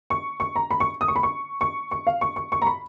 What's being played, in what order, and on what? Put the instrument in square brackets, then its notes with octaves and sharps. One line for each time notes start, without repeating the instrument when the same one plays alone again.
[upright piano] C#6
C#6
A#5
B5
C#6
D#6
C#6
B5
C#6
C#6
C#6
F5
C#6
C#6
C#6
A#5
B5